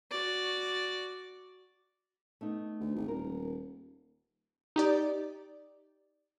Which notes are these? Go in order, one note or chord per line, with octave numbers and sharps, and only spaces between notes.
F#4 D5
A3 B3 D#4
D2
G#1
D#1 A#4
D#4 G4 D5